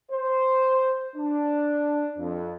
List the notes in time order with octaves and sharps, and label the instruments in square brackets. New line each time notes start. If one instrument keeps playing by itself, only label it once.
[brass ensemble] C5
D4
F2